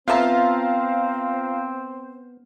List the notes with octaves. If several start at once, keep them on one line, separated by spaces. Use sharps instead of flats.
B3 C4 F4 C5 E5 F5 A5 A#5